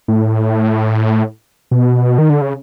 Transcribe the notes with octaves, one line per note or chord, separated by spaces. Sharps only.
A2
B2
D#3
D3
C#3